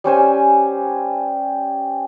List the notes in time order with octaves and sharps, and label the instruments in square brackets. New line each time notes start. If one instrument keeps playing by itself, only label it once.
[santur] G3 C#4 C5 G#5